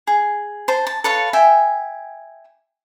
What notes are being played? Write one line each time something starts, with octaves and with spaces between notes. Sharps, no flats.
G#4
C5 A5
A5
A4 B4 C#5 F5
E5 G5 G#5